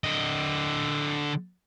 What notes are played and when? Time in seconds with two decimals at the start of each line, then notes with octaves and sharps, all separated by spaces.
0.04 D3 D#5